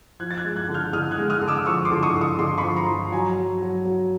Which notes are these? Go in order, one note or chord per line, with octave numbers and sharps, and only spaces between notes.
F3 F#6 G#6
A6
F#6 G#6
G#3
F#6 G#6
D3
F6 G6
D3 D#6 F6
F#6 G#6
G#3
D#6 F6
D3
D6 E6
F3 C#6 D#6
C6 D6
D3
C#6 D#6
D3
C#6 D#6
D3 C6 D6
B5 C#6
F3
A#5 C6
F3
F#3 G#5 A#5
F#3
F#3
F#3